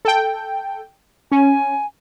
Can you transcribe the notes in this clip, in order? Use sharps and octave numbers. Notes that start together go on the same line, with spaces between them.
A4 G5
C#4 G#5